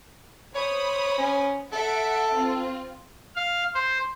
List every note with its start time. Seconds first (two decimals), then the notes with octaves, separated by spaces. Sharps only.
0.55 C5 C#5 B5 D#6
1.18 C#4
1.73 A4 E5 F#5 D7
2.34 C4 F4
3.35 F5
3.74 C5